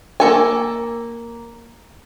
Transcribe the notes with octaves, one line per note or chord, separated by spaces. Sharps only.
A#3 A4 G#5